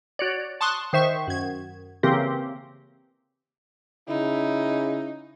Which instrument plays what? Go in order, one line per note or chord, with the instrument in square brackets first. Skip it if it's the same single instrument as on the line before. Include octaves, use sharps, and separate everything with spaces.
[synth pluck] F#4 C#5 D5
A5 C6 C#6 D#6 F#6
D#3 C5 E5 C#6
F#2 G#6
C#3 E3 A#3 C4 G4 A#4
[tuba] C#3 [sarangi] D#4 [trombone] E4